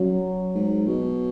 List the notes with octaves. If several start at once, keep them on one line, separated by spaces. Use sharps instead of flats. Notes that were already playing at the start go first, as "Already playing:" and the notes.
Already playing: F#2 F#3
G#2
B2